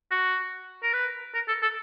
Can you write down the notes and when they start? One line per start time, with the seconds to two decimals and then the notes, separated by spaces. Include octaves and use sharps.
0.11 F#4
0.83 A#4
0.93 B4
1.34 A#4
1.48 A4
1.62 A4